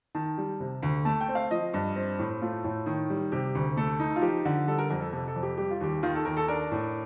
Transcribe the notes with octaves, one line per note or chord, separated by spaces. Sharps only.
D#3 A5
G3
C3
D2
A3 A5
G5
C4
F5
F3 D#5
G2
C4
A2
A3 F4
A2
D#3
G3
C3 G4
D2
A3 A4
D#4
F4
F3 G4
D3
G3 A4
A#4
F2 A#4
A4
C3 A4
A4
F2
G4
G3 G4
F4
D#2 G4
D#3 F4
A4
D#2 A#4
A4
D4 A#4
A2